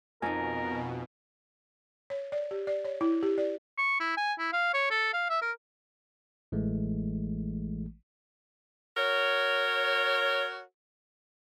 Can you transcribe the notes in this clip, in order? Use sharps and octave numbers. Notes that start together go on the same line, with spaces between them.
F2 B2 D#4 A#4 G#5
C#5
D5
G4
D5
C#5
E4
G4
D5
C#6
E4
G#5
E4
F5
C#5
A4
F5
E5
A#4
A1 E3 G#3 A3
F#4 A#4 C#5